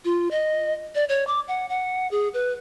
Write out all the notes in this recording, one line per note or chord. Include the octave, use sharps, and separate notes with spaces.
F4
D#5
D5
C#5
D6
F#5
F#5
G#4
B4